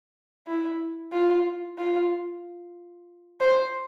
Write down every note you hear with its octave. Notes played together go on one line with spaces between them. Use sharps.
E4
F4
F4
C5